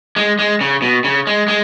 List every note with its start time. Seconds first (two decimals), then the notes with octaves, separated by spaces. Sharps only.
0.16 G#3
0.39 G#3
0.61 C#3
0.82 B2
1.04 C#3
1.27 G#3
1.48 G#3